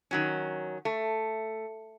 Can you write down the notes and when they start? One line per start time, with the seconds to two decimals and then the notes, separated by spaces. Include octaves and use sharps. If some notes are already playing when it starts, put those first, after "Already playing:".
0.11 D#3 F#3 C#4
0.85 A3